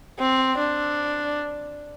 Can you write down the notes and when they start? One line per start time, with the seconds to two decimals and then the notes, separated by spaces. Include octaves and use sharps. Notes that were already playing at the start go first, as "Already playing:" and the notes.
0.19 C4
0.58 D4